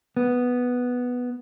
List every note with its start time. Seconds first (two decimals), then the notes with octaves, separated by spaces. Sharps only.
0.17 B3